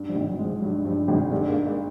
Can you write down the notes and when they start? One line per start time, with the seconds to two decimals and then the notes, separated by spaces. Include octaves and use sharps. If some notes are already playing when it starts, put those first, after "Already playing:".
Already playing: G2
0.09 F3 G3
0.16 G#1
0.27 F#3
0.39 G#3
0.45 F3
0.62 G2 F#3
0.85 G2 F3 G3
1.08 G#1 F#3 G#3
1.31 G2 G3 A3
1.48 G#3 A#3
1.55 G2
1.66 G#3 A#3